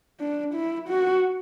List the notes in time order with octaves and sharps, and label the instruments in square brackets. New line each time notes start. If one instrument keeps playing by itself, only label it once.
[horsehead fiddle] D4
E4
F#4